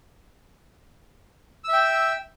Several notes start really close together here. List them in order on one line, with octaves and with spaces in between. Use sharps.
E6 E5 G5